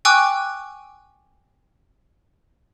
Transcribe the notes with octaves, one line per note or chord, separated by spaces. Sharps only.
G5 G#5 C#6 D6 E6 F#6